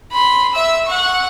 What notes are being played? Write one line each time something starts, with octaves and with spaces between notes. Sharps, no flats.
B5 C6
E5 E6
F#5 C#6